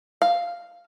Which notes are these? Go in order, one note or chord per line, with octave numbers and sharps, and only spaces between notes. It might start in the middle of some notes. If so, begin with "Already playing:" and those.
F5